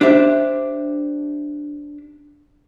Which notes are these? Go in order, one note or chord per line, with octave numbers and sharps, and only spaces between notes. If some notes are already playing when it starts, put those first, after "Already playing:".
D4 G4 C5 E5